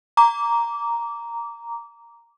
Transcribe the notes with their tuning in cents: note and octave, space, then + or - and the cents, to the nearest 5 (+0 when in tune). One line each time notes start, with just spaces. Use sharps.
A#5 +0 D6 -20